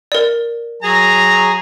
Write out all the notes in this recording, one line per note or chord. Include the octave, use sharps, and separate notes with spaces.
A#4 D5
F#3 G#4 A#5